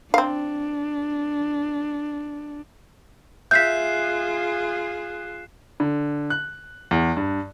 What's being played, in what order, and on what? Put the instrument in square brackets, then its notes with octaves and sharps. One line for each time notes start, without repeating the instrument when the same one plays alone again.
[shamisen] C4 F5 [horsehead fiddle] D4
[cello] F4 G#4 [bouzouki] E5 [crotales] F#6 C7 E7 [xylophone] G6 B6
[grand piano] D3
F#6
E2
G2